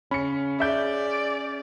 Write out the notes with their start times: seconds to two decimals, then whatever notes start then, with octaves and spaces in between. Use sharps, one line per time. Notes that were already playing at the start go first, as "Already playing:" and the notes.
0.11 C#3 C#4 B5 C#7
0.60 G#4 D5 E5 G6